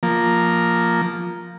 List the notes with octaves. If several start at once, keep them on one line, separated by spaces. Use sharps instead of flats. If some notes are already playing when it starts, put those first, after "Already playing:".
F3 A#3